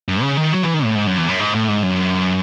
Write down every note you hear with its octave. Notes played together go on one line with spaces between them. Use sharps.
F#2
C#3
D#3
F#3
E3
D#3
A2
G#2
F#2
E2
F#2
G#2
A2
G#2
F#2